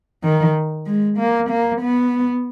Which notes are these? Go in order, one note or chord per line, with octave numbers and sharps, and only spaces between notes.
D#3
G#3
A#3
A#3
B3